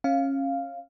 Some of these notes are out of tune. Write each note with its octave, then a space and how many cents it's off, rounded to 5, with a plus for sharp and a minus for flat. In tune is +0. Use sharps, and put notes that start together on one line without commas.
C#4 -25 F5 -5